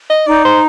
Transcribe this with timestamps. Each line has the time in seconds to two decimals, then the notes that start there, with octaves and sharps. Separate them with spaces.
0.10 D#5
0.27 D#4 D5
0.45 C5